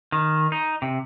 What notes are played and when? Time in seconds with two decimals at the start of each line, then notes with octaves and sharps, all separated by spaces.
0.12 D#3
0.52 D#4
0.82 C3